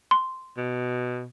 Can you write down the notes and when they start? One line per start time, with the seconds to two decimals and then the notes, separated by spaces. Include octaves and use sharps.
0.11 C6
0.57 B2